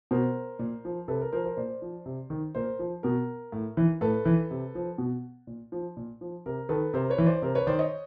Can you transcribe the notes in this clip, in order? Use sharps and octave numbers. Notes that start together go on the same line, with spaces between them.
B2 A#4 C5
A#2
F3
C3 A4 B4
A#4
F3 A#4 C5
A#4 C5
A#2 C5 D5
F3
C3
D#3
A#2 A#4 C5
F3
B2 A#4
A2
E3
A2 A4 B4
E3
C3
F3
B2
A#2
F3
A#2
F3
C3 A#4
D#3 A4 B4
C3 A#4 C5
B4 C#5
E3
C5 D5
C3 A#4 C5
B4 C#5
D#3 C5 D5
C#5 D#5